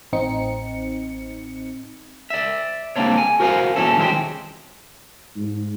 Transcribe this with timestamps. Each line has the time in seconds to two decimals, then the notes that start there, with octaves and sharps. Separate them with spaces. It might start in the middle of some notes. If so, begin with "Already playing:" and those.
0.13 A1 C4 D#4 C#7
2.30 D5 E5
2.96 C#2 G3 A#3 C4 D4 C#5
3.18 G#5
3.40 F#4 A#4 C5 D5 F5 G#5
3.76 E2 A#2 F#3 C#4 E4 A4
3.98 D#3 F#3 G#3 C4 G4 C5
5.37 G#2